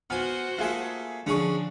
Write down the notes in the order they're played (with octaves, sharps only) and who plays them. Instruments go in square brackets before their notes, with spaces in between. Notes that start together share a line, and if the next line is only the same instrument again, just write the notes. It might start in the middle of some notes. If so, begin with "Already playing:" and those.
[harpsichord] B3 G#5 [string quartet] F#4 C5 F#5 [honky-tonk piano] F6
[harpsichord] A3 A#3 E5 [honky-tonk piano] F4 G#4
[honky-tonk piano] D3 C#6 [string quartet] F3 D4 [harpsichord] C#4 G#4